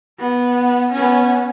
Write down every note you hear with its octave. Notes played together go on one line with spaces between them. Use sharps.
B3
B3 C#4